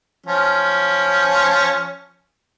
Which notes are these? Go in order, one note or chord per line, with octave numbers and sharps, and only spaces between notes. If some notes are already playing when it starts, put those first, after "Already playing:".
F3 C#4